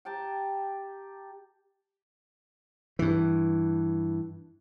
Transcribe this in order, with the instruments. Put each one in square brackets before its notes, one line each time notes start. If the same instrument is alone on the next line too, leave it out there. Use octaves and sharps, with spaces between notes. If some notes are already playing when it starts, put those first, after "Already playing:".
[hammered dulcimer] G4 G5 A5 A#5
[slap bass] G2 E3